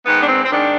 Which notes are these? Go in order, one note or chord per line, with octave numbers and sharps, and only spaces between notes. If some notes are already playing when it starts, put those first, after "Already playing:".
G#2 D#3 B3
D4
C4
C4
G#2 D#3 D4